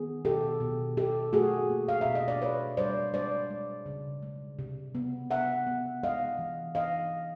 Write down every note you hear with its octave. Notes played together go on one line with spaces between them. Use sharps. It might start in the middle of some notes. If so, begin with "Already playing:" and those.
Already playing: D#3 B3 G#4
B2 G4 A4
B2
B2 G4 A4
A3 F#4 G#4
A#3
F5
B2 E5
D#5
D5
A#3 B4 C#5
G3 C5 D5
G#3 C5 D5
G#3
C#3
G#3
C3
B3
B3 E5 F#5
B3
G#3 D#5 F5
E3
E3 D#5 F5